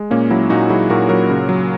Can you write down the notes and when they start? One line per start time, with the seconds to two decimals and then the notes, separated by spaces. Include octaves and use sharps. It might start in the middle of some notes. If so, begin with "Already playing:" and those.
Already playing: G#3
0.10 A#2 A#3 C#4
0.30 F#3 C#4 E4
0.50 A#2 D#4 F#4
0.70 F#3 E4 G#4
0.90 A#2 F#4 A#4
1.09 F#3 F#4 A#4
1.30 C#3
1.49 F#3